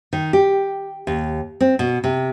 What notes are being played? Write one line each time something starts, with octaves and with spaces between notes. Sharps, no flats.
D#3
G4
D#2
C4
B2
C3